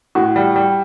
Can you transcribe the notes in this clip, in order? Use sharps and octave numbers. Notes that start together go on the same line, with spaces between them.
A2 F#4
G3
G3